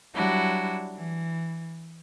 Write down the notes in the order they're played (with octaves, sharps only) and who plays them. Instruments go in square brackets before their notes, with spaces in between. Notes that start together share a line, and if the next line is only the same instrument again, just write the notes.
[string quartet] F#3 G3 D4 E4 F#4
E3